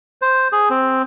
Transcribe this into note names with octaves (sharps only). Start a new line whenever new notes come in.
C5
G#4
C4